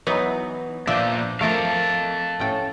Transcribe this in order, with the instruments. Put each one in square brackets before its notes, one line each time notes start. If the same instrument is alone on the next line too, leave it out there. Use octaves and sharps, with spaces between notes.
[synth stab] E3 F#3 D#4 [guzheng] B3
[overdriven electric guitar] A#2 D4 [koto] F3 [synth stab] D5 G6 [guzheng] E5
[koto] F3 A3 [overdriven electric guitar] A4 F5 [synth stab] A#4 D6
[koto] A2 C#4 G5